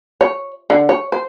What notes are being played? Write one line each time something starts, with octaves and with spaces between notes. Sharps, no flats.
C#5
D3
C#5
C5